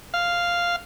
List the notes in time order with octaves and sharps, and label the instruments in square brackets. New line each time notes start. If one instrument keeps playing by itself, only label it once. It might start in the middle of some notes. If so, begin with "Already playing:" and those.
[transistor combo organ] F5